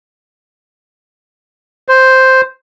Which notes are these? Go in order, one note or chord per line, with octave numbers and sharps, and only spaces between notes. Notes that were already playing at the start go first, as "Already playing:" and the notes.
C5